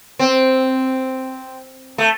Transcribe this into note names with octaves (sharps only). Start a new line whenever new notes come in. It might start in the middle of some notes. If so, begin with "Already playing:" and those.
C4
A3